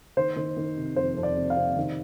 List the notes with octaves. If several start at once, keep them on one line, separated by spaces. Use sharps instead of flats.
D#3 C5
D#3
D#3
C3
F2 C5
F2
D5
C3
F5
C3
D#3